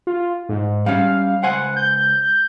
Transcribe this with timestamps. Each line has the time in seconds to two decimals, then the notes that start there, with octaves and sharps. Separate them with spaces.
0.07 F4
0.49 G#2
0.86 G3 C#4 F5
1.43 C#2 C5 F#5 G#5
1.76 G6